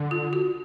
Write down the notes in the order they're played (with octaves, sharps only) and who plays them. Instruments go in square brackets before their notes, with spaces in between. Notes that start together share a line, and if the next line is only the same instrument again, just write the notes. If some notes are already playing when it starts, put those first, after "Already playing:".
Already playing: [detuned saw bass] D3
[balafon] F4
F#4